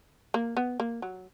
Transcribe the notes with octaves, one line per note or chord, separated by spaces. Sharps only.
A#3
B3
A#3
F#3